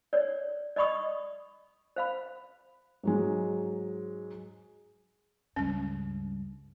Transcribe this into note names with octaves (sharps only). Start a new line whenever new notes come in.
C#5 D5
D5 D#5 B5 C#6 D#6
C5 F5 B5
G#2 F#3 G#3
C#2 G2 C#4